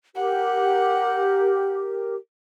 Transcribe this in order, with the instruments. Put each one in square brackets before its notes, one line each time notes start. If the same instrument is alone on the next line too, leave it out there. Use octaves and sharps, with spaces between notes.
[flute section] G4 A#4 [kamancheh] F#5